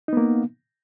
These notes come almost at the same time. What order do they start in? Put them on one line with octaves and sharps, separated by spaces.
D#4 B3 A#3